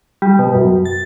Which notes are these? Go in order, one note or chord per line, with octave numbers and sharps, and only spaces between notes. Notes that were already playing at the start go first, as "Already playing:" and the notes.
G3
B2
F#2
A6